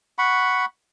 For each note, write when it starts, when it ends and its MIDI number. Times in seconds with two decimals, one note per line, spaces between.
0.18 0.65 78
0.18 0.65 83
0.18 0.65 85